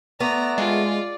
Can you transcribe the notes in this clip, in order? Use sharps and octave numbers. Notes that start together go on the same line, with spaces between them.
A3 B3 D5 A#5
G#3 F4